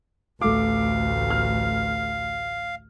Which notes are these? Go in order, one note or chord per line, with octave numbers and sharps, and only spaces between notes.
A1 D2 A3 F5 D6
F6